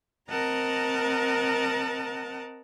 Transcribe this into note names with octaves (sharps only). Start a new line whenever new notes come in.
C4 A#4 D#5 F#5 A5 A#5